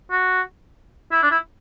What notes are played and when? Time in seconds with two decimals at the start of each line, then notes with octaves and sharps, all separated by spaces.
0.11 F#4
1.12 E4
1.23 D4
1.31 E4